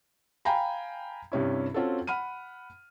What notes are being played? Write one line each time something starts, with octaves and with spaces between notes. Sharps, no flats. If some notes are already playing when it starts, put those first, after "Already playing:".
F5 G5 G#5 A#5 B5
G2 C3 C#4 E4
C4 C#4 F4 F#4 A4
F#5 B5 F6 D#7